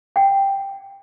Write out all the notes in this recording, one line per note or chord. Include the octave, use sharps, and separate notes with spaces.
F#5 G5